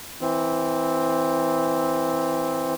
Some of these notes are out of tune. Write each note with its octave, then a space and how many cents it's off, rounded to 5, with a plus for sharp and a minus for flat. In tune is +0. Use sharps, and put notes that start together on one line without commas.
E3 -10 C4 +0